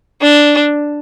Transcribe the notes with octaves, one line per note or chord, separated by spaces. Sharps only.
D4